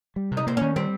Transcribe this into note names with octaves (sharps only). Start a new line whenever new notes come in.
G3
C3
D#4
A#3 C4
D#3 C#4
G3 C4